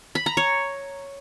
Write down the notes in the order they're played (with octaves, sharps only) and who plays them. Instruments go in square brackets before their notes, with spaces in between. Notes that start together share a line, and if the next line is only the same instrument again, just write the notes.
[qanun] B5
A#5
C#5